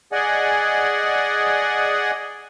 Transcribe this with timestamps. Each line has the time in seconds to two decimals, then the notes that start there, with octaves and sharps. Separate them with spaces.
0.12 G#4 D5 D#5 F#5 G#5